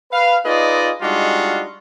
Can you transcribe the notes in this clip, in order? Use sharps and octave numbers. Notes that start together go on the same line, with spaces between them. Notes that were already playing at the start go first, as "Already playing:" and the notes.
B4 F5
D#4 F4 G#4 B4 D5 D#5
G3 G#3 D4 D#4 F4 F#4